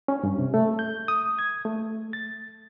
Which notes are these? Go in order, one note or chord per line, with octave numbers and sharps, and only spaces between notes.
C#4
G2
C3
A3
G6
D#6
G#6
A3
A6